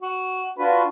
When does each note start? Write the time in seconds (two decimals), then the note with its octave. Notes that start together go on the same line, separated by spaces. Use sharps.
0.02 F#4
0.58 D4 F4 F#4 B4